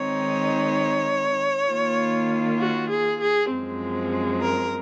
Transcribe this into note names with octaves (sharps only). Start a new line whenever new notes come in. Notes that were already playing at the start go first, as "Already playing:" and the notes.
Already playing: D#3 G#3 C4 D#4 C#5
D#3 A#3 F4
F#4
G#4
G#4
F#2 F3 G#3 C4
A#4